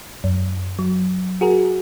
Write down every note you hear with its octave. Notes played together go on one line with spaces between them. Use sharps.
F#2
F#3
F#4 G#4 A#4